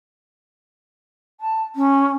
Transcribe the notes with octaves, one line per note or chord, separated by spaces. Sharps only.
A5
C#4